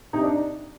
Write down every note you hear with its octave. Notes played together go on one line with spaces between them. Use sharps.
C3 D#4
D4